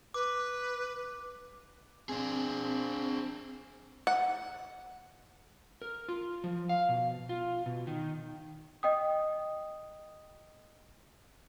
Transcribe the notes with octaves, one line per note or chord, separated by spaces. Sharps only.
B4 D6
C4 D4 G#4
F#5
A#4
F4
F3
F5
B2
F4
B2
D#3
D#5 G5 D#6